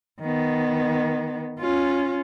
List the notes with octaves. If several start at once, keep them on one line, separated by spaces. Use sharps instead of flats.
D#3 B3
C#4 F4